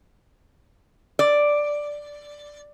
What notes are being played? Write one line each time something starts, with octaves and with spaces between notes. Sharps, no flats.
D5